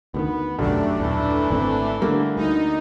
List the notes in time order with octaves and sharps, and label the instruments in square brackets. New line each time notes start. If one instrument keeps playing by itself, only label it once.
[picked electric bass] D2 D3 D#3 [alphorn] B3
[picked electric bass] E1 B1 D3 [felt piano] F#2 [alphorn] G3 [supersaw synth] A3 D4
[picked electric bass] D#1 B1 [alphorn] E3
[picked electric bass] G#1 D3 C4
[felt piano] D3 A3 A#3 [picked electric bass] G3
[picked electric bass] D2 [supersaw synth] D#4